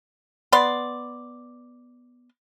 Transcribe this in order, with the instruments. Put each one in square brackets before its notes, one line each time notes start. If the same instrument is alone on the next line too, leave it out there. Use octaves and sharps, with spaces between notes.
[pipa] B3 D5 C6